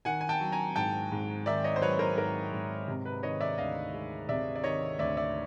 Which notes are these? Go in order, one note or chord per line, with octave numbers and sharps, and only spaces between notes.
D#3 F#5 G#5
G#5
G5 A5
F#3
G#5 A#5
G#2 G5 A5
G#2
D#3 D5 E5
C#5 D#5
C5
F#3 B4 C#5
A#4 C5
G#2 A#4
G#2
C3
B4
D#3 C#5 D#5
D5 E5
D2 D#5 F5
G#3
C3 D5 E5
D5
D#3 C#5 D#5
D2 D5 E5
D5 E5